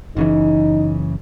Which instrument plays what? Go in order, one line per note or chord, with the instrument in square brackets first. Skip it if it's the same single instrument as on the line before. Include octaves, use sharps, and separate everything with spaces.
[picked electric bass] F#1 C#3 E3 [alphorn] D#4